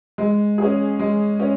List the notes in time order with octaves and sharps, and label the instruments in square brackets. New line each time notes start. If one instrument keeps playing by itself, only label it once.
[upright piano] G#3
C#4 G#4
G#3
C#4